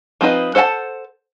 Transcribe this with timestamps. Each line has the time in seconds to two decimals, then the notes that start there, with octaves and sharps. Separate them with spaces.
0.21 F3 C4 D#4 B4 D#5
0.55 A4 C5 F#5 G#5 A5